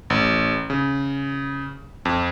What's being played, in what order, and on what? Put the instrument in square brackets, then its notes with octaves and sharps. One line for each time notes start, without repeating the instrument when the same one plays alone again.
[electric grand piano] A1
C#3
F2